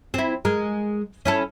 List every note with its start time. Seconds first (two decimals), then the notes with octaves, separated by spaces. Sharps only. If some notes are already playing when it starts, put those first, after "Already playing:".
0.14 C4 E4
0.45 G#3 A#4
1.25 C#4 E4 A4